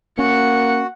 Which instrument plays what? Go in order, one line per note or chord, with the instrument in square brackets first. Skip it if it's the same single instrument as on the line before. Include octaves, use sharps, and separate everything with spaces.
[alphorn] A#3 [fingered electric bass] C#4 [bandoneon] F#4 [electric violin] F#5 C#7